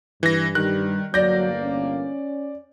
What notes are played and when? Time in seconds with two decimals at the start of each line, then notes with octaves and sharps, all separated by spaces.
0.23 G2 E3 A#6
0.55 D#3 G3 F#6
1.14 G1 E2 F#3 A#3 D5 G6 A#6
1.62 C#4